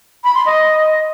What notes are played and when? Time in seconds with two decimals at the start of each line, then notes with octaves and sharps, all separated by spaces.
0.24 B5
0.35 C6
0.46 D#5